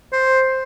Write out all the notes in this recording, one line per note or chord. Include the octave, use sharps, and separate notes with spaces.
C5